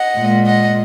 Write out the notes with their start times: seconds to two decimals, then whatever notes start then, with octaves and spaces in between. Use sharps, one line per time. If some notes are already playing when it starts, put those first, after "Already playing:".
Already playing: D#5 F#5
0.17 A#2 G#3
0.46 D#5 F#5